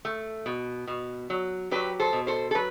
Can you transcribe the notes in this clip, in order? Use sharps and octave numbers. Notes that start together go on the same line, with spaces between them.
A3
B2
B2
F#3
F#3 G4 B4
A4 C5
B2
A4 C5
A4
F#3 B4